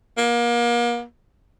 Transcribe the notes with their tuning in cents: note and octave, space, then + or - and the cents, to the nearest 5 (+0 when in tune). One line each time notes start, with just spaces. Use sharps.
A#3 +35